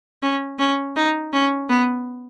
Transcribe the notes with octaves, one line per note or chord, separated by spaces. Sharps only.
C#4
C#4
D#4
C#4
B3